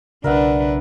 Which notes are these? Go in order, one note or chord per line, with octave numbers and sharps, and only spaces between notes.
B1 C#3 D4 A#4 B4 D5 E5 F#5